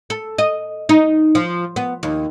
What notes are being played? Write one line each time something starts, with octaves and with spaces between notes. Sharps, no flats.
A4
D#5
D#4
F3
B3
D#2